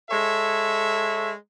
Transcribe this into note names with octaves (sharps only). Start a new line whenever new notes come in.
G#3 A4 C#5 E5